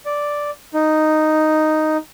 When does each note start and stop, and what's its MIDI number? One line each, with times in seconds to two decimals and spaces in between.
0.06 0.51 74
0.74 1.97 63